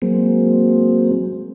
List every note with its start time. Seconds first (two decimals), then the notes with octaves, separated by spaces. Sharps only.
0.02 F#3 G#3 A#3 C4